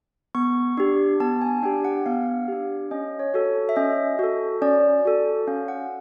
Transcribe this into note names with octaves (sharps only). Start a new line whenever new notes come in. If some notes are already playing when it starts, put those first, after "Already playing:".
B3 C#6
D4 G4
B3 A5
G#5
D4 G4 G5
F#5
B3 F5
D4 G4
C#4 D#5
C#5
F#4 A4
E5
C#4 D#5
F#4 A4
C#4 D5
F#4 A4
C#4 F5
F#5